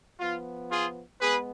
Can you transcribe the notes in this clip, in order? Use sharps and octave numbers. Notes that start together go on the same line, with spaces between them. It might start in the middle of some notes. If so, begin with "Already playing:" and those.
F3 B3 F4
F4 G#4
G#3 B3 G#4 B4